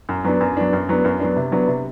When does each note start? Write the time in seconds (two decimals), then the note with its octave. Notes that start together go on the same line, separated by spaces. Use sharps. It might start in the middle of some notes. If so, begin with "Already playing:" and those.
0.09 F#2
0.24 F#3 B3 D4
0.41 F#2
0.57 F#3 B3 D4
0.73 F#2
0.89 F#3 B3 D4
1.05 F#2
1.20 F#3 B3 D4
1.36 C3
1.52 F#3 B3 D4
1.68 C3